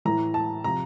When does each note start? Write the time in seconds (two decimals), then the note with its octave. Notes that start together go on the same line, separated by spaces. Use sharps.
0.05 A2 E3 A#5
0.34 A5
0.64 C3 F3 A#5